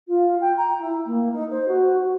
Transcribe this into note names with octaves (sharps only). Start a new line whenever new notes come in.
F4
G5
A#5
E4
A#3
D#4
C5
F#4
F#4